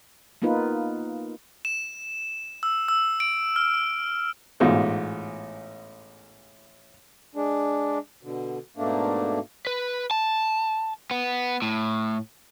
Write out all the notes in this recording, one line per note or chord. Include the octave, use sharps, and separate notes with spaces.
A#3 B3 D#4 F4 B4
E7
E6
E6
D7
F6
A1 G#2 B2 F4
G#3 D4
B2 D3
G#2 B2 A3 A#3 D4
B4
A5
B3
A2